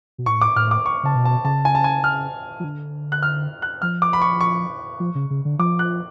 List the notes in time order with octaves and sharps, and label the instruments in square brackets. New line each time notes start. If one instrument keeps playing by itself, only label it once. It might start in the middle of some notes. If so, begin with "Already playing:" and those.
[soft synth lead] B2
[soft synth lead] A2 [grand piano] C#6
[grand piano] D6
[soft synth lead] A2 [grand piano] F6
[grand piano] D6
C#6
[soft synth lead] C#3 [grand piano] A5
[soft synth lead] B2
[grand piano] A5
[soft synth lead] C#3 [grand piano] A5
[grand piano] G#5
A5
G#5
F6
[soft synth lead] F3
D3
[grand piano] F#6
F6
F#6
[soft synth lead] F3 [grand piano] F6
[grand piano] D6
B5
C#6
C#6
[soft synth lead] F3
C#3
C#3
D3
[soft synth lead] F3 [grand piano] D6
[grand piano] F#6